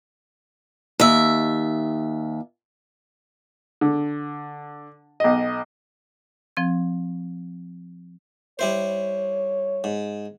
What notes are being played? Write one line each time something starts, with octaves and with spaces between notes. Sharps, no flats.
D#2 E5
D3
B1 D#5
F3 C4 G#6
G3 E4 C5 C#5
G#2